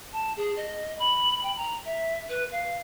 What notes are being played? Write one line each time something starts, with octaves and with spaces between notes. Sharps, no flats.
A5
G#4
D#5
B5
G5
A#5
E5
B4
F5